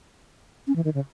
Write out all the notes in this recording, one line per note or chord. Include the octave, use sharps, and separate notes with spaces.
C#4
E3
D#3
C#3